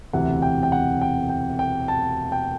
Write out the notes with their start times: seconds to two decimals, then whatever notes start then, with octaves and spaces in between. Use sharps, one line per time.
0.13 E1 D2 C3 E3 F#5
0.42 G5
0.63 G5
0.72 F#5
1.01 G5
1.29 G5
1.59 G5
1.88 A5
2.32 G5